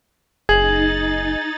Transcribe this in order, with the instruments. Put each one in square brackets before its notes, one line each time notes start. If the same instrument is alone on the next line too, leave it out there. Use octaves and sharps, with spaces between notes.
[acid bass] F#1 [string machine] D#4 A6 [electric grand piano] G#4 [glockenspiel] G#6 F#7